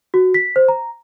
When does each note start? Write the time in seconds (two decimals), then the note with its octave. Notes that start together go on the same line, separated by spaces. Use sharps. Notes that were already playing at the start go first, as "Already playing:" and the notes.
0.14 F#4
0.34 B6
0.56 C5
0.68 A#5